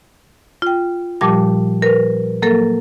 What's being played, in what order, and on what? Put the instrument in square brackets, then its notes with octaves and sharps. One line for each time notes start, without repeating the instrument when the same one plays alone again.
[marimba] F4 G5
A#2 F3 G3 G4 A5 D6
A#4 B4
F#3 A#3 A4 A#4